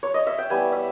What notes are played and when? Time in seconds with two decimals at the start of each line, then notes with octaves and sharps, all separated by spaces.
0.03 C#5
0.14 D#5
0.27 E5
0.38 G5
0.50 G3 B3 E4 G#5
0.72 E5